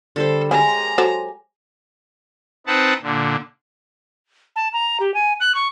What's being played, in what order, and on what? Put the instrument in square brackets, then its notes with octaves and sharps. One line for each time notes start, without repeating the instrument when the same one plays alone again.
[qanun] D3 G3 C5 [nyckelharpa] A4
[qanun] G#3 G4 [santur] G#5 [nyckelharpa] A#5
[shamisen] F#3 A4 C5
[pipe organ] C4 D#4 B4 F#5 A5
A#2 D3
[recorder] A5
A#5
G4
G#5
F#6
C#6